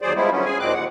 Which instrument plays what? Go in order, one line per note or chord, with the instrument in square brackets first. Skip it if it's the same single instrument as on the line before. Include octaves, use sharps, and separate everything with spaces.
[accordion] D#2 F#3 G#4 C5 D5
F3 G3 G#3 B3 E4
D3 F#3 B3 C#4
G#4 G#5
D#2 A#2 G#3 C4 D6 F#6
D#2 F#5